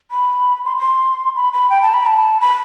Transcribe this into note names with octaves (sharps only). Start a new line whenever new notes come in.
B5
C6
C6
B5
B5
G5
A5
B5
A5
B5